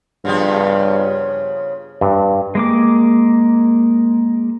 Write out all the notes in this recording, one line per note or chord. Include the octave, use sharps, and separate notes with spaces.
G2 C#3 F3 B3
G2
G#3 A#3 D6